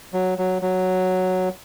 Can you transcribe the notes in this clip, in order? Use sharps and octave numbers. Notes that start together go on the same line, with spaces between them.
F#3
F#3
F#3